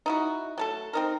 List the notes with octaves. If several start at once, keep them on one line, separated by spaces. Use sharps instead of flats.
D#4 E4 F#4
F#3 A3 A4
C4 D#4 A#4